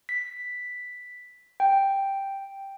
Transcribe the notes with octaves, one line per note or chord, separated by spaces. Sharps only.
B6
G5